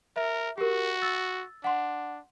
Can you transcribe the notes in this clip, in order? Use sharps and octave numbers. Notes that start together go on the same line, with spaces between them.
A#4 E5
F#4 G4 A#4
E6 A6
D4 F#5 C6